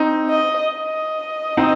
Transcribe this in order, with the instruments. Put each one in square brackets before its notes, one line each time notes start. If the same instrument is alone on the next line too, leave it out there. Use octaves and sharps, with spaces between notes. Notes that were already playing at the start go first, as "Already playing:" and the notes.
Already playing: [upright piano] C4 D#4
[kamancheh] D#5
D#5
[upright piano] C4 D#4